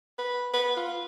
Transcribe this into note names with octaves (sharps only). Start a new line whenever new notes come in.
B4
B4
F4